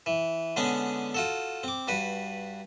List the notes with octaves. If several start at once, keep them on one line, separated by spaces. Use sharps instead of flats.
E3
D3 G#3 B3 C#4 D4
F4 F#4 A4
C4 D6
G2 F#4 B4